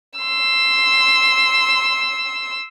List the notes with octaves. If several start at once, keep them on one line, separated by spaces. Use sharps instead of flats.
C6 E6